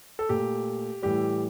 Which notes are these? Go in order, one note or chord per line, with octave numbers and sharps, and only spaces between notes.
A4
A#2 A3 G4
A2 E3 G3 G4